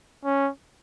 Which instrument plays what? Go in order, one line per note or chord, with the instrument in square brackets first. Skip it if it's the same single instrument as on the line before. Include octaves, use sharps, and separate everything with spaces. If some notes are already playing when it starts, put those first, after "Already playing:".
[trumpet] C#4